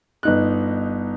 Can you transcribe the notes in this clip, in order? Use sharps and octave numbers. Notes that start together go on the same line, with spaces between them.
G1 D#4 F#6